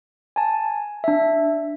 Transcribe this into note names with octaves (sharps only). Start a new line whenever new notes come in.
G#5 A5
D4 E5